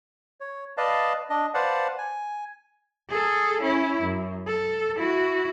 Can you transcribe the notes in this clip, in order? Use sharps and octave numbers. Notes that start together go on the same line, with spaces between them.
C#5
B4 D5 D#5 F5 A5
D4 D#5
B4 C5 D5 F5 F#5 A5
G#5
G#4 A4
C#4 E4
F#2
A4
E4 F#4